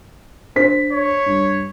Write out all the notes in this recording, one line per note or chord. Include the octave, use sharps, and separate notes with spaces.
D4 C5 B6
C#5
G2